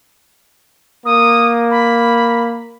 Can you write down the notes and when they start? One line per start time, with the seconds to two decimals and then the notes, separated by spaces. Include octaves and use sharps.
1.06 A#3 D#6
1.71 B5